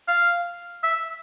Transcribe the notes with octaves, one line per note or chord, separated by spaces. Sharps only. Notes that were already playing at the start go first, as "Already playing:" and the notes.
F5
E5